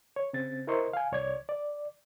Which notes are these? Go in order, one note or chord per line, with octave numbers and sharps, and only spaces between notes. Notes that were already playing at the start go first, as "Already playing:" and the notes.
C#5
C#3 C4 A6
E4 A#4 C5 D#5 C6 C#6
F5 G#5
C2 C#5 D5 G#6
D5